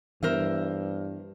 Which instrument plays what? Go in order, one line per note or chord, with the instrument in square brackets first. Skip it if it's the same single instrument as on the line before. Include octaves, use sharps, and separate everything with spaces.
[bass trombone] G2 [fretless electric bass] E3 B3 [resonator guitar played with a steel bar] A#4 C5 E5